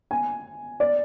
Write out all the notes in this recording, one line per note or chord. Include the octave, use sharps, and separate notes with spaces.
G#5
D5